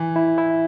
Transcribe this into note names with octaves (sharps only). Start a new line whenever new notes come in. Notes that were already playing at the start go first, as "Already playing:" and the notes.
Already playing: E3
E4
E4